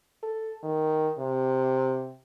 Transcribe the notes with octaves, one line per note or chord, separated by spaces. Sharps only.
A4
D#3
C3